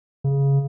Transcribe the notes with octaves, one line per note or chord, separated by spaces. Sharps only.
C#3